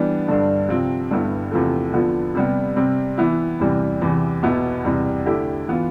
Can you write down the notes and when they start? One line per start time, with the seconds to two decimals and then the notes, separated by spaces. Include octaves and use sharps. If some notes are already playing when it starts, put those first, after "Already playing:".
Already playing: E3 G3 B3 D4
0.28 G2 D3 G3 D4
0.68 C3 F3 C4
1.11 G2 D3 G3 B3 E4
1.52 E2 C3 F3 A3
1.94 D3 F3 B3 F4
2.35 C3 G3 B3
2.76 C3 G3 C4
3.18 E3 B3 E4
3.60 E2 C3 E3 G3
4.02 E2 C3 E3
4.43 E2 B2 B3 E4
4.84 E2 C3 G3
5.25 D3 A3 E4 G4
5.68 E3 B3 F4